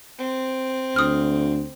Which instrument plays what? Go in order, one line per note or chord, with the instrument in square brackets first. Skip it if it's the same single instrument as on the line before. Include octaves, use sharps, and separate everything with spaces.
[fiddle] C4
[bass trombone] D2 [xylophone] D#6 F6